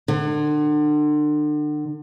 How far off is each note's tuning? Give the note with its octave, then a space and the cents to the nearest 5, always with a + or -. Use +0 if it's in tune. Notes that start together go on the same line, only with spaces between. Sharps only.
D3 +35